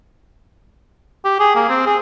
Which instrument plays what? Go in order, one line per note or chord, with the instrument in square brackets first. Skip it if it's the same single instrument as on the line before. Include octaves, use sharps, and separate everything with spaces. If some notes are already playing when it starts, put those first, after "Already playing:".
[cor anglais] G4
G#4
A#3
C4
G#4